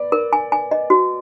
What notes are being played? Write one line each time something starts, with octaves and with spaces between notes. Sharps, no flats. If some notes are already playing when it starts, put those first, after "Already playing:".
Already playing: B4 D5
A#4
G#5
G#5
D#5
F#4